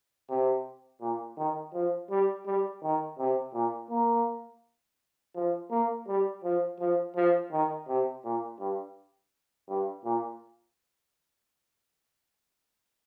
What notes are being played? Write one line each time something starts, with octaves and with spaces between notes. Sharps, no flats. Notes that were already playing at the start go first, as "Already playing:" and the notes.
C3
A#2
D#3
F3
G3
G3
D#3
C3
A#2
A#3
F3
A#3
G3
F3
F3
F3
D#3
C3
A#2
G2
G2
A#2